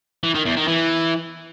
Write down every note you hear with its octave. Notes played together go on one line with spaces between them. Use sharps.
E3
D#3
E2
D#3
E3